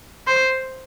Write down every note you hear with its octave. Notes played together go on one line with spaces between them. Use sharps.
C5